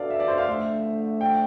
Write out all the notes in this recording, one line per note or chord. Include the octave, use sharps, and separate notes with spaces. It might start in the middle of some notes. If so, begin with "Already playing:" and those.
Already playing: B2 A3 D4 A4 D5 F5
E5
D5
C5
F5
D3 F3 A3 E5
G5